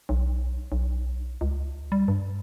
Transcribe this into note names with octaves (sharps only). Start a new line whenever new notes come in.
B1
B1
C#2
G3
G2